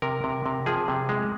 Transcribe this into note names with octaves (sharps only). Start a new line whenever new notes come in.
C3 A#4
C3
C3
F3 G#4
C3
G#3